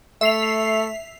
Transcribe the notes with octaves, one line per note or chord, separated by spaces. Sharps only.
A3 E5 C7 F7